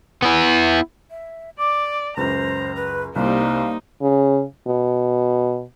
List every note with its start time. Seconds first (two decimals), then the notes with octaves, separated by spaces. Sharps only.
0.23 B3 E4
1.11 E5
1.59 D5 D6
2.17 C#2 F#2 C5 A#5
2.76 B4
3.16 C2 G3 A#3 D#4 C5 F5
4.02 C#3
4.67 B2